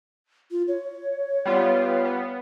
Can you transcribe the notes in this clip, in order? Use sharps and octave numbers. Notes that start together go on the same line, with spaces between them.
F4
C#5
G3 B3 F4
B3